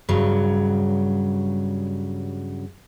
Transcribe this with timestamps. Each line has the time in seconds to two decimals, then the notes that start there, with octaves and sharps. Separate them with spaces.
0.09 G2 C#3 F#3